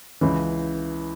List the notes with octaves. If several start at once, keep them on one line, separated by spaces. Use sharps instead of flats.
C#2 C#3 E3